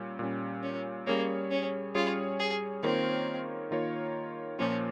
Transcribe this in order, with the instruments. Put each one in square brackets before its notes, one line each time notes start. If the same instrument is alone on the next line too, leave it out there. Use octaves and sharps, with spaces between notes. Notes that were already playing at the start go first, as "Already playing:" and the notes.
Already playing: [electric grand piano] A#2 G3 C#4
A#2 G3 C#4
[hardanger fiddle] C#4
[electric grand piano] G3 C#4 G#4 C#5 [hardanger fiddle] A#3
[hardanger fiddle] C#4
[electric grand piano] G3 C#4 G#4 C#5 [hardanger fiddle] F4
[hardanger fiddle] G#4
[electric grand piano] D#3 A#3 F4 A#4 C#5 [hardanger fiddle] C4
[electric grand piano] D#3 A#3 F4 A#4 C#5
[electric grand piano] A#2 F3 A#3 F4 [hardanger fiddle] C#4